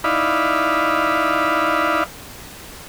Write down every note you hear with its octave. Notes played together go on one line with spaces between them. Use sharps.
D#4 E4 D5 F5 B5